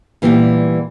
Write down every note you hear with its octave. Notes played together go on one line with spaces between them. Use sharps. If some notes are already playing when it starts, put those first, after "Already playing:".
A#2 E3 G3 B3 G4